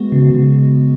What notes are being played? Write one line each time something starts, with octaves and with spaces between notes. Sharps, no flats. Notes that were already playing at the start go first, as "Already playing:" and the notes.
Already playing: G#3 B3 F#4
C#3
C#3